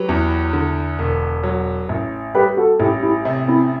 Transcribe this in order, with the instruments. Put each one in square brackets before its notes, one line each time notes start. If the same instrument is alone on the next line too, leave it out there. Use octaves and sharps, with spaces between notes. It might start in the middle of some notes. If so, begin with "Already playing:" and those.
Already playing: [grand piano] F#3 [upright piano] G4 B4
[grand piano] E2
D3
E1
F#3
A1
[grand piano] G3 [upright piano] G4 B4
[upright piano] F#4 A4
[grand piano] A1 [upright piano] E4 G4
[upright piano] E4 G4
[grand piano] C3
[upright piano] C4 E4